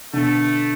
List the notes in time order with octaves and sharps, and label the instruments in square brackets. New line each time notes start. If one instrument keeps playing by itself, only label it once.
[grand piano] B2 D3 [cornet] A3